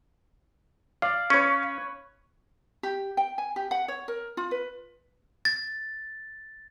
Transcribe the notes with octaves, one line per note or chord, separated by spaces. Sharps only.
D5 F5
C#4 B4 C#5
G4
G5
G#5
G4
F#5
C#5
A#4
F4
B4
A6